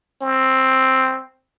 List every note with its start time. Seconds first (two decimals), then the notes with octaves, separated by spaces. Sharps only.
0.22 C4